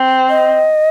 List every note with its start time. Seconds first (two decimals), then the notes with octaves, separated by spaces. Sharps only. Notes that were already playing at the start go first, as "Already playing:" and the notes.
Already playing: C4
0.30 D#5